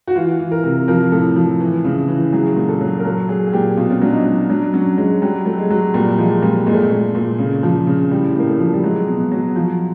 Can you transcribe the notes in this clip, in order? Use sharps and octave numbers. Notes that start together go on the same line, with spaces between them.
F#4
E3 F4
E3
A#4
C3
F3 A#4
A2 A4
F3
E3
C#3
E3
F#3 G#4
A#2
A4
F#3
A#4
F#3 A4
F#3 G#4
G#4
A#2 G4
B2 F4
C#4
F#3 D4
D#4
F#3
F#3 D4
F#3 C#4
F#3 G#3
F#3 G3
F#3 A3
G#3
F#3
A#2 G3
F3 G#3
A#2 G3
A#2 G#3
A3
G#3
A#2
A#2
C#3
F3
C#3
A2 G3
A2 A#3
A3
F3
G3
F#3 G#3
B2
F#3
F3